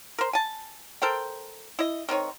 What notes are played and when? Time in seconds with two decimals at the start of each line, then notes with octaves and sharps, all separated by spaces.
0.18 A#4 C5
0.33 G#5 A5
1.02 A4 A#4 C5 G5
1.79 E4 D#5
2.09 D#3 C4 D#4 C#5